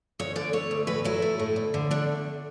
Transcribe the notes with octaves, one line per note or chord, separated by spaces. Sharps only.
D2 C#5
D3 D5
A3 C#5
D2
A2 B4
F#3 E4
A3
A2
D2
D3
A3 D4